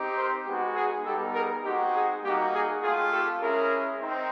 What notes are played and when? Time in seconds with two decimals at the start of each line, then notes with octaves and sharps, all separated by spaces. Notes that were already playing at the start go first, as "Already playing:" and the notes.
Already playing: C4 D#4 G4
0.17 A#4 C5
0.46 G#3 B3 D#4 F#4 G4
0.76 G#4
1.05 G3 B3 D#4 G4 A4
1.34 G#4 A#4
1.64 G#3 C4 D#4 F#4 G4
1.94 G#4
2.23 G3 A#3 D#4 F#4 G4
2.53 G#4
2.82 A3 C4 F4 G#4
3.11 G4 A4
3.41 G#3 C#4 E4 G#4 A#4
4.00 C4 D#4